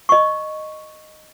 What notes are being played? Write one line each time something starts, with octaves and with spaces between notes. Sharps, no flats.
D#5 C#6